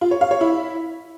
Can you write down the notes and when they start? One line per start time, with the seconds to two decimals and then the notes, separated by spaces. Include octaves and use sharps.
0.01 F4
0.11 C#5
0.21 F5
0.31 C#5
0.41 E4